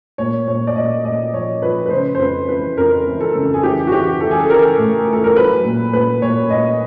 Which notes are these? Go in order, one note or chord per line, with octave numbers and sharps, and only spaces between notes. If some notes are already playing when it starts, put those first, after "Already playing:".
A#2 C#5
A#2 C#5
D5
A#2 D#5
A#2 D#5
F3 C#5
F3 B4
B4
C#3 C5
C5
F2 B4
E3 B4
F2 A#4
E3
A4
C#3
G#4
E3 G4
F#4
E3 G4
E3 A4
G#4
A4
E3 A#4
A2
E3
A4
A#4
F#3 B4
A#2
A#2 B4
A#2 C#5
A#2 D#5